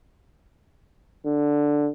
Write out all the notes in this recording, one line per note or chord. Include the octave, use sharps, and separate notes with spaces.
D3